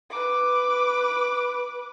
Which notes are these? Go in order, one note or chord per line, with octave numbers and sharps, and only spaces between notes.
B4 D6